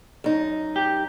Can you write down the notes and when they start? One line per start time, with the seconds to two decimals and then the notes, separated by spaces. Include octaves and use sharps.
0.24 F#2 D#4
0.76 G4